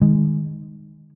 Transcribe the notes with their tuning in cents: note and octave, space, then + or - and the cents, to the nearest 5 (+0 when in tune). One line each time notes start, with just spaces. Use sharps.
D#3 -10 G#3 -15